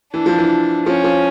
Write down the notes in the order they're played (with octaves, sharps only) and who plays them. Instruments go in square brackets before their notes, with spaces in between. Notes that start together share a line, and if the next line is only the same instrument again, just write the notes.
[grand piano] E3 [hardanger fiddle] D4
[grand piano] F3
E3
[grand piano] F3 [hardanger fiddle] C#4
[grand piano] F3